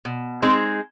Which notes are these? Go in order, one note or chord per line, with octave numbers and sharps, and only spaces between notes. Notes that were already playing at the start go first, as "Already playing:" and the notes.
B2
G#3 C4 D#4 G#4